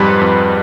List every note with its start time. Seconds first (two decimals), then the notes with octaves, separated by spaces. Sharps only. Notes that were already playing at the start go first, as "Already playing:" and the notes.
Already playing: F2 G#2 G3 B4
0.21 F2